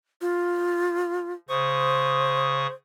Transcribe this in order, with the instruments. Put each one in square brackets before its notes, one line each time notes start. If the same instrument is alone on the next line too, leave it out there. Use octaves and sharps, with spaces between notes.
[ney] F4
[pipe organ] C#3 C#6 D#6 [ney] C5